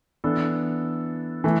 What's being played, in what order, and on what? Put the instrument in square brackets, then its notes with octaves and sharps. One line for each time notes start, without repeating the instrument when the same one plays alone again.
[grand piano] E3 B3 D4 A4
E3 A3